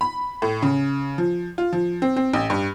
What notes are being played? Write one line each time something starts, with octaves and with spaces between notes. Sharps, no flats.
B5
A2
C#3
F3
F4
F3
C4
C4
A1
G2